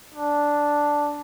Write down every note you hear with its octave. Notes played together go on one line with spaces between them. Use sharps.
D4